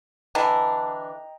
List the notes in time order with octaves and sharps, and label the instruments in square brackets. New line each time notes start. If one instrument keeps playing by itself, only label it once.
[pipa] D3 E3 D4 [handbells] D#5 G5 A#5